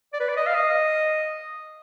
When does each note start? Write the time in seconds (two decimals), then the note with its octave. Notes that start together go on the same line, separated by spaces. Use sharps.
0.13 D5
0.20 B4
0.29 D5
0.37 D#5
0.46 F5
0.55 D#5